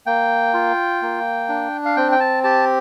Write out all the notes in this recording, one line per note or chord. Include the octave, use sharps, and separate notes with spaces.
A#3 G5
F4
A#3
D4
F5
C4 G5
G5
A5
G4 A5